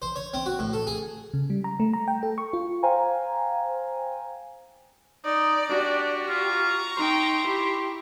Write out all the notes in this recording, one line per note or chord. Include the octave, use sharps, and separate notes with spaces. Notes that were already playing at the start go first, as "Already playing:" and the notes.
C5
C#5
C4
F#4
A2
A4
G#4
C#3
G3
A#5
A3
A#5
G5
A4
C#6
F4
C5 F5 G5 G#5 A#5
D#4 D5
D4 F#4 G4
F4 A#5 C#6
D#4 G5 C6
E4 G4